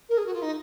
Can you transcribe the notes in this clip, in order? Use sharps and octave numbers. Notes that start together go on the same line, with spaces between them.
A#4
G#4
F#4
F4
D#4